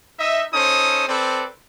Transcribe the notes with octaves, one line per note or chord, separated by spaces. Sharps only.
D#4 D#5 E5
C#4 D#4 A4 C5 D#6
C4 A4 B4 C5 D5